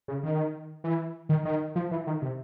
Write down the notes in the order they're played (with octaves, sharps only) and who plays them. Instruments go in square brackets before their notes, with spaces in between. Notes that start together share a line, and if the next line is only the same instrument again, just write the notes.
[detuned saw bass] C#3
D#3
E3
D#3
D#3
F3
E3
D#3
C3